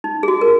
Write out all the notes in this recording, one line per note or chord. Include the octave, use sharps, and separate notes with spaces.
D#4
G#4
F#4
A#4